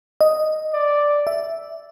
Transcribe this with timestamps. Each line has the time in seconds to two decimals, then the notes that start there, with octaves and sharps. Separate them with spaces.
0.21 D#5
0.73 D5
1.27 E5